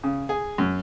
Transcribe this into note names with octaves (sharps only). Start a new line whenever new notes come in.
C#3
G#4
F#2